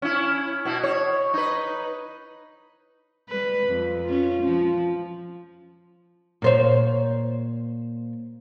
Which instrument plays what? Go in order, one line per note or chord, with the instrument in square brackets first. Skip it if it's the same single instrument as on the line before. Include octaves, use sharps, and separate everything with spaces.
[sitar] C#4 E4
B2 E4
C#5
D#4 B4
[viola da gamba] G3 B4
F2
C#4 F4
F3
[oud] A#2 C5 C#5